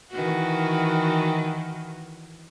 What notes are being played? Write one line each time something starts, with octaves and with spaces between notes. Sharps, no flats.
D#3 E3 F#4